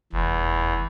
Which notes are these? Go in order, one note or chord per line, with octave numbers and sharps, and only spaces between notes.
F1 E2